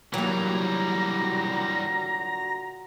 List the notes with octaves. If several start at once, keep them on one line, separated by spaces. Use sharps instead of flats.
A#2 D3 E3 F#3 G3 A#3 F#4 A#5